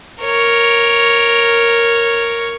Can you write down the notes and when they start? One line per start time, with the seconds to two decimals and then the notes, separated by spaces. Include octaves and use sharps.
0.23 A#4 C#5